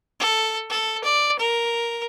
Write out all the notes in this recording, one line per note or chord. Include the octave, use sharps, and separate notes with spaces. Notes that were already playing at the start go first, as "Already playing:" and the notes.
A4
A4
D5
A#4